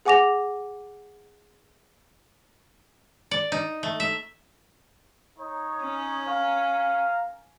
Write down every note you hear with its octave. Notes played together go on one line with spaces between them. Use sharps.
G#4 F#5 G#5 D6 A#6 F7
D5
D#4
A3
E5
D#4 C#5
C#4
A#4 F5 A#5